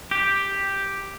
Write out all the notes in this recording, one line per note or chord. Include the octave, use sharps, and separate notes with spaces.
G4